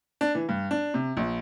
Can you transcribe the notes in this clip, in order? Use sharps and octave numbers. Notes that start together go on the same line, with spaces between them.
D4
E3
G2
D4
C3
A#1